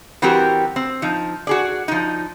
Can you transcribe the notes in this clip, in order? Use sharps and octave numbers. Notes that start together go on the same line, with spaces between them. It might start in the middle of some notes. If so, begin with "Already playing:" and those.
E3 G3 C4 F#4 G4 A#4
C4
F3 D#4
F#4 G#4 D5
F3 D#4